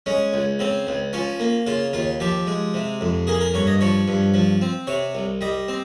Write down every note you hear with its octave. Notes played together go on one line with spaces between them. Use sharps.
G#3 C#4
C#2
C#3 C4
C#2
F3 C#4
A#3
C#3 F4
D#2 F4
F3 G4
G#3
C3
F2
A#3 G#4
A#4
G2 C#5
D#5
F3 C#5
G2
F3
C4
C3 C#5
C2
G3 D#5
C4